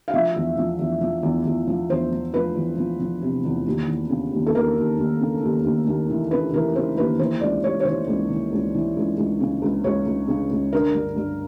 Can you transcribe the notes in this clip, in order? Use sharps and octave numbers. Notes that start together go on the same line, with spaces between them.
F5
F3 E5
E2
F3
E2
F3
E2
E2
F3
E2 C5
F3
F3 B4
E2
F3
F3
C3
E2
D#2
E3
C#3
D#2
A4
D#2 A#4
D#2
D#2
C#3
D#2
D#2
D#2
E3
C#3 B4
E3 A#4
C#3 C5
D#2 B4
E3 C5
C#2 D5
C#2 C#5
C#5
E3 C5
C#2
E3
C#2
E3
C#2
C#2
C#3
C#2
C#2 C#5
C#2
C#3
C#2
D3 A#4
G2
G2